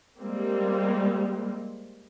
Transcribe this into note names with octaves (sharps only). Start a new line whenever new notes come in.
G3 G#3 A#3 C4